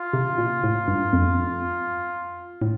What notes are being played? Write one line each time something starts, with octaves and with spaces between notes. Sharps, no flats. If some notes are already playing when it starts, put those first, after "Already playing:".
Already playing: F4
C3
A#2
A2
G2
F2
A2